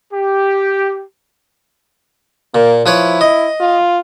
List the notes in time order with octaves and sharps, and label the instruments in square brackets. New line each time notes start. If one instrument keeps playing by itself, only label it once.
[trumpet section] G4
[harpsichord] A#2 [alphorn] A#3
[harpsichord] F3 B4 C#5 [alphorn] E4
[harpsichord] D#5
[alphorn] F4